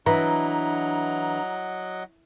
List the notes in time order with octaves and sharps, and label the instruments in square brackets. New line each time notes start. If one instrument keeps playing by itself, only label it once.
[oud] E3 [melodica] F#3 D#5 F#5 [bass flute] D4 [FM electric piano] A#5